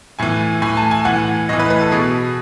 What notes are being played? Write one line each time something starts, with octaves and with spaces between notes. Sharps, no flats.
A2 E3 G#5
A2 E3 G#5
A5
G#5
A2 E3 F#5
A2 E3 D#5
B4
B4
A4
B2 G#4